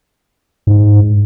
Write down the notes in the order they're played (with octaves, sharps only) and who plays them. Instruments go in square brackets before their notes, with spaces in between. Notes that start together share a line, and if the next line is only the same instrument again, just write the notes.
[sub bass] G#2